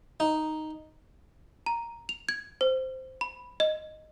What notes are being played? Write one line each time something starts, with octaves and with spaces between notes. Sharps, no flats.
D#4
A#5
F7
G#6
C5
B5
D#5